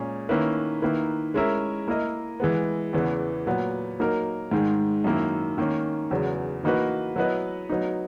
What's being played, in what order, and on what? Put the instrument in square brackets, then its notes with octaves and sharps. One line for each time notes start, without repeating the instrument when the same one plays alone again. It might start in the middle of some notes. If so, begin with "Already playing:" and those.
Already playing: [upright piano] A#2 G#3 C#4 G#4
D#3 A#3 C#4 E4 B4
D#3 A#3 E4 B4
G#3 C#4 E4 A#4 E5
A#3 E4 A#4 D#5
E3 G#3 B3
E2 C#3 E3 B3
A#2 F#3 B3
F#3 A#3 D#4 A#4
G#2 D#3 G#3
F#2 D#3 A#3 E4
D#3 A#3 C#4
E2 C#3 F#3 B3
E3 A#3 D#4 F#4 B4
F#3 B3 E4 B4 D#5
F#3 B3 D#4